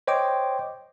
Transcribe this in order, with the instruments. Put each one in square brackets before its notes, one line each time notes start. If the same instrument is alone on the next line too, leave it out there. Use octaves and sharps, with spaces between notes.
[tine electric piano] C5 C#5 D#5 G5 C6 D6